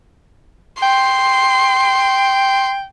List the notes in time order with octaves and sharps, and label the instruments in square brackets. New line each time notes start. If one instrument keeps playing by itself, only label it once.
[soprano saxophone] G5 [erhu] C6